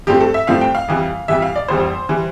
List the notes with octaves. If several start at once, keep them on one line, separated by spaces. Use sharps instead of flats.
G2 F3 A3 C4 G4
A4
E5
G2 F3 A3 C4 F5
G5
F5
F2 E3 G3
F2 E3 G3 E5
F5
D5
F1 F2 E3 G3 C5
E3 G3